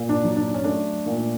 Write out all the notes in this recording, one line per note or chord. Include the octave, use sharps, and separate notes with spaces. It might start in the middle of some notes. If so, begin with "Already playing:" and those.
Already playing: A#2
D4
F#3
D4
C#4
A3 D4
A#2